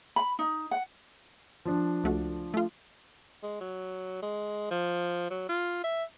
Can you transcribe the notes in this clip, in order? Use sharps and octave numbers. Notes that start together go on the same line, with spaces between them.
B5
D#4
F#5
F3 D4
C#2 A3 F#4
A3 F4
G#3
F#3
G#3
F3
F#3
F4
E5